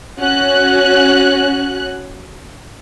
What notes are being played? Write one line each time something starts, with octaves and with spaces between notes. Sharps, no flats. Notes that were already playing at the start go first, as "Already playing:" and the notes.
C#4 F#4 F#6